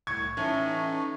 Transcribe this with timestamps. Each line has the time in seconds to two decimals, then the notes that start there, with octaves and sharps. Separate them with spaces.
0.07 C2 A2 C#6 G#6 C#7
0.37 A2 E3 C#4 D#4